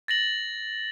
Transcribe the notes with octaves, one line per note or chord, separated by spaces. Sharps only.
A6 A#6 F#7